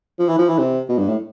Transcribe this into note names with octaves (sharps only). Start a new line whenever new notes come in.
F3
E3
F3
E3
C3
B2
G2
A2